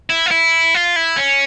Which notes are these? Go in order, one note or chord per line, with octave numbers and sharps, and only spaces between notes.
E4
F4
E4
F4
E4
C#4